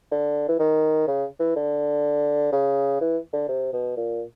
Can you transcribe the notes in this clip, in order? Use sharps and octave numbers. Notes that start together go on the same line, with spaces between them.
D3
E3
D#3
C#3
E3
D3
C#3
E3
D3
C3
B2
A#2